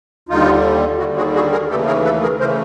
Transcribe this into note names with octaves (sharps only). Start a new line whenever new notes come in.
D#2 D3 G3 D#4 F4
D#2 D3 G3 E4 F#4
F#4 G#4
F#4 G#4
G#4 A#4
D#2 C#3 E3 A3 G4 A4
G#4 A#4
A4 B4
G#4 A#4
C#3 E3 A3 A#4 C5